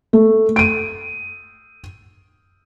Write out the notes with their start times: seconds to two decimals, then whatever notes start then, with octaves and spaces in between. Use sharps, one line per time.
0.13 A3
0.56 D7 D#7